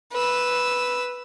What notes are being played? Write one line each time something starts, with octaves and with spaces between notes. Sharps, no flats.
B4 E6